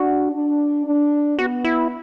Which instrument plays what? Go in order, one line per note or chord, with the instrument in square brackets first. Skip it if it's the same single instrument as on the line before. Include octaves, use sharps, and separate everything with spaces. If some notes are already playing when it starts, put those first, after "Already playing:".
Already playing: [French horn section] D4 [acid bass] F#4
[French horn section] D4
D4
[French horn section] B3 [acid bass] F#4
[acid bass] E4